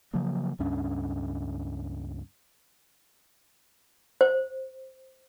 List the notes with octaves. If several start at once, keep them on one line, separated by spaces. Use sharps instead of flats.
C#3 F3 F#3 A#3
C#2 G2 C#4 D4
C5